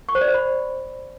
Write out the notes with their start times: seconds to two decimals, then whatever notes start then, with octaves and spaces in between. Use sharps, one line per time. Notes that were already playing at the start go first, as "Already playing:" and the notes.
0.09 C#6
0.15 C5
0.21 D5
0.28 C5
0.34 B5